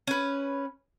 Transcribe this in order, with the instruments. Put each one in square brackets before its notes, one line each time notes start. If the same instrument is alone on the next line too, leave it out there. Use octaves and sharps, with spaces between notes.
[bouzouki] C#4 B4